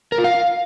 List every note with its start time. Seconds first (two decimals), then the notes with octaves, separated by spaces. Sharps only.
0.12 A#4
0.18 F4
0.24 F5